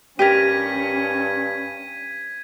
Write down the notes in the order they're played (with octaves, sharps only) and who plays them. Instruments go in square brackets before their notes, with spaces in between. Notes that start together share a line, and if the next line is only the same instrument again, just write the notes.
[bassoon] G2 [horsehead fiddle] C#4 [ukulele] G4 A#4 [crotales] G#6 B6 D#7